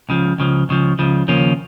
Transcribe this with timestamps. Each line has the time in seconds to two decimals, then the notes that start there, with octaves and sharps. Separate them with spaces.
0.09 C#2 C#3 F3
0.38 C#2 C#3 F3
0.69 C#2 C#3 F3
0.99 C#2 C#3 F3
1.28 D#2 C#3 F3 A#3 C#4